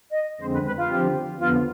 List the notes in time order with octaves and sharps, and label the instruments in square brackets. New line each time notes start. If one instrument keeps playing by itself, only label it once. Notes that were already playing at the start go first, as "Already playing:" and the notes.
[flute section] D#5
[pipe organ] F2 D3 G#3 C4 [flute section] C5
[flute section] B4
B4
F4
[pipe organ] D3 F3 C4 G4
[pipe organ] F2 D3 F3 B3 [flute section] F4